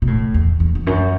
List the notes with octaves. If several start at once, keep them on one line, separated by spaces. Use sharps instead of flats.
B2
A2
E2
E2
E2
F#2